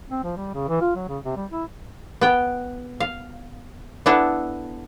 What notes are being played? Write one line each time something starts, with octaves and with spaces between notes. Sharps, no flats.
C4
F3
G3
C#3
E3
F4
F#3
C#3
C3
G3
E4
B3 G5
F5
B3 D4 E4 A4